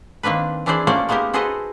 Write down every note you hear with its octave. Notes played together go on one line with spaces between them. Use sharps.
D#3 A#3 C4 D4 B4
E3 D4 E4 G#4 C5 D5
A3 A#3 C#4 F#4 C5 D5
G#3 A#3 B3 D#4 G4 A#4
F#4 G#4 A4 B4 C5 D#5